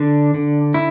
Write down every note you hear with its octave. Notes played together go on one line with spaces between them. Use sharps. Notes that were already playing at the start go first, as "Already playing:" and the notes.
Already playing: D3 D4
D3
E4